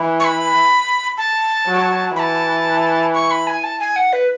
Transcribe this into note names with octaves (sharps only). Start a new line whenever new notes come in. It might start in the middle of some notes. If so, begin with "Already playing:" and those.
Already playing: E3
C#6
B5
A5
F#3
E3 A5 B5
C#6
B5
G#5
A5
G#5
F#5
B4